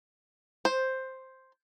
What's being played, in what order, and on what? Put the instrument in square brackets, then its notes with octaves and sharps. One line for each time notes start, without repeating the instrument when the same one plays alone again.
[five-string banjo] C5